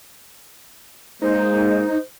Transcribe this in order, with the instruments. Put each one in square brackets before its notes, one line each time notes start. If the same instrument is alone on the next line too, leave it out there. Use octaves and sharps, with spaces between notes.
[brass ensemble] G#3 A#3 [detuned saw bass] D#4 [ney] C5